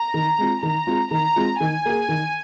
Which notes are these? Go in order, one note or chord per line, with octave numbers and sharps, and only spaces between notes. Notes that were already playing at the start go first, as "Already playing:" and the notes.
Already playing: A#5
D#3
G#3 C4 F4
D#3 A#5
G#3 C4 F4
D#3 A#5
G#3 C4 F4
D#3 G#5
A#3 G#4
D#3